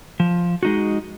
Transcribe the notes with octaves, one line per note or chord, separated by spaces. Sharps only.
F3
G#3 D#4 F#4